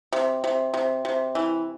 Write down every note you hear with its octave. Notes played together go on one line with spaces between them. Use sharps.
C3
C3
C3
C3
E3